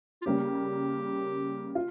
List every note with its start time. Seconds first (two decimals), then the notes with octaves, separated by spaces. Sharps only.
0.22 F4
0.25 C#3 G3 A#3 C#4 G4
1.75 F4